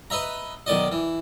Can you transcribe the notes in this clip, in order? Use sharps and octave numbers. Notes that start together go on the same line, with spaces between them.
B4 D#5 E5 A#5
B1 D#3 D5 D#5
E3